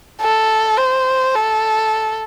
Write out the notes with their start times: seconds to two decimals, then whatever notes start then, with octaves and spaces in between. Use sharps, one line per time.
0.21 A4
0.78 C5
1.35 A4